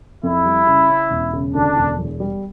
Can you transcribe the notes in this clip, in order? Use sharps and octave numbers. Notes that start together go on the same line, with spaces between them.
F2 E4
G3
C#3
C#4
E1
C#3
D2 D4
E1
E2
G3